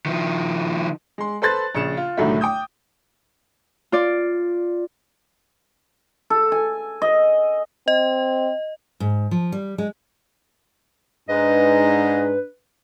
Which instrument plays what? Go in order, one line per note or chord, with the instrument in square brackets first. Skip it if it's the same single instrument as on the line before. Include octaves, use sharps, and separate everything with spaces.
[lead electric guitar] D#3 F3
[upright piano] G#3 C6
A4 B4 C5 C6 F#6 A6
A#1 C#3 C#7 E7
F4
C2 A2 D3 D#3 F#3 A3
G5 D6 D#6 G6
[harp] F4 D5
[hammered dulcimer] A4
G#5
D#5
[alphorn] C4 [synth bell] D#5
[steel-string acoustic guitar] G#2
F3
G3
G#3
[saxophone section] G#2 [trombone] D4 [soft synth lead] B4 [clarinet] D#5